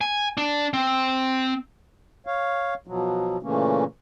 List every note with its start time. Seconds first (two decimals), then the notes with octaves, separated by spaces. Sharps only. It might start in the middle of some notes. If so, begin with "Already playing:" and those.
0.01 G#5
0.38 D4
0.73 C4
2.27 C#5 F5
2.87 B2 F3 F#3
3.43 A#2 C#3 E3 A3 A#3 C#4